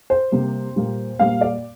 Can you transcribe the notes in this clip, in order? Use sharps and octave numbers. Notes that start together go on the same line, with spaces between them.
C5
C3 G3 A#3
A#2 G3 A#3
A#2 G3 A#3 F5
D5